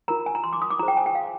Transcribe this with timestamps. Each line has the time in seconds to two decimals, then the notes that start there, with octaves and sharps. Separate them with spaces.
0.08 F4 A#4 A#5
0.26 G#5
0.35 A#5
0.44 C6
0.53 D6
0.62 D#6
0.70 D6
0.79 F4 G#4 C5 A#5
0.88 G5
0.97 G#5
1.06 G5
1.15 F5